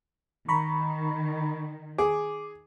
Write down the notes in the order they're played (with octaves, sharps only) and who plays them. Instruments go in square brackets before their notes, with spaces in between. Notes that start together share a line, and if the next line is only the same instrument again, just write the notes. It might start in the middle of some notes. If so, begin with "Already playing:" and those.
[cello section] D#3 [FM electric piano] A#5 B5 C#6
[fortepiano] G#4 [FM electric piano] D6